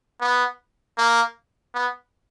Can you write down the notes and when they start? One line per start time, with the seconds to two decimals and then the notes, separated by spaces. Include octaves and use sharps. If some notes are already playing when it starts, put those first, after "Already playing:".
0.21 B3
0.98 A#3
1.74 B3